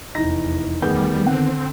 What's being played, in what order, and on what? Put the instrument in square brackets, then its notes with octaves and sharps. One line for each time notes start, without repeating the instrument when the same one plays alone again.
[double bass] F1 E2 [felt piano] E3 A#6 [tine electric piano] D#4
[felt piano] D2 G#4 G6 [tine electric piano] D#3 B3 [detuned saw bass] G3
[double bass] D3 [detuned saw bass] C4 [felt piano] F#5